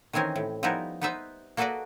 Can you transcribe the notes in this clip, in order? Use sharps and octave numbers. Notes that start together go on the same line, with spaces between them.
D#3 E3 C4 C#4 A#4
A2
F3 G3 B3 D#4 E4 A#4
B3 D#4 B4 C5 E5
A#3 F#4 A4 B4 D5 D#5